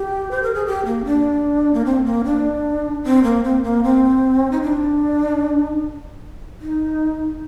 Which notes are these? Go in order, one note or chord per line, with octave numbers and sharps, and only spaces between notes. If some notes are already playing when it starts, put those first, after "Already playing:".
Already playing: G4
C5
A#4
G#4
G4
A#3
D4
A#3
C4
A#3
D4
C4
A#3
C4
A#3
C4
D#4
D4
D#4